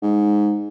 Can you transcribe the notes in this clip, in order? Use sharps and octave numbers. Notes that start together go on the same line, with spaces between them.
G#2